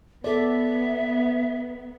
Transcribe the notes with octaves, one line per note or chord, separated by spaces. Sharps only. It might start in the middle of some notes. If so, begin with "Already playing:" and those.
B3 A4 D5 E5